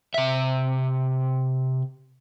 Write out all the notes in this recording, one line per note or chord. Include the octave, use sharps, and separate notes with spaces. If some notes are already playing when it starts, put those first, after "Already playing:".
C3 E5